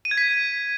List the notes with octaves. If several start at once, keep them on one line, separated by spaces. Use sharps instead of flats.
D#7
G#6
B6